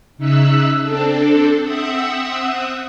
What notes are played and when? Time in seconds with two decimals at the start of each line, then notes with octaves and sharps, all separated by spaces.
0.18 C#3 D#4 E5 E6 F#6
0.82 C4 D4 A4
1.61 C4 E5 F#5 D#6 E6